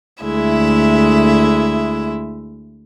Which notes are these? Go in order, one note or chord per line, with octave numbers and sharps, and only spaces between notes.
D2 G#3 E4 E5